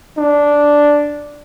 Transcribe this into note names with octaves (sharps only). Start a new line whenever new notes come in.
D4